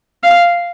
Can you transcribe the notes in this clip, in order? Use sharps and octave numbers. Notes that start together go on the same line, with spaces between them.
F5